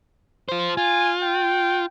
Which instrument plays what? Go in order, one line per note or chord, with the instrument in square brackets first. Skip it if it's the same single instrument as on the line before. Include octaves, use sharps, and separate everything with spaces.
[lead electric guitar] F4 C5
[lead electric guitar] F4 [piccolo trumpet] G#5
[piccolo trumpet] G5